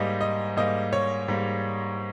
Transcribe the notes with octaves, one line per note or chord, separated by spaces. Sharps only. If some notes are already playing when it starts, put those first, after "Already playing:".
Already playing: G#2 G3 A#3 D#5
D#5
G#2 G3 A#3 D#5
C#5
G#2 G3 A#3